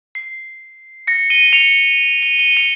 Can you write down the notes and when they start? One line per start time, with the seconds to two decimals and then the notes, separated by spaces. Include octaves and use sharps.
0.15 C7
1.07 A#6 C#7
1.30 D#7 G7
1.53 C#7 F7
2.22 D#7 G7
2.39 D#7 G7
2.56 C#7 F7